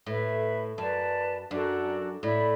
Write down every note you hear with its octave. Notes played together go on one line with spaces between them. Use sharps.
A2 B4 E5 B5
F#2 B4 D5 A5
F#2 D4 F#4 A4
A2 E4 D5 B5